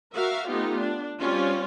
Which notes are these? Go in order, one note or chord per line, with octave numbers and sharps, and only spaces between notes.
F#4 A#4 E5 F5
A3 B3 D#4 F4 G4
D4
G3 C4 C#4 F4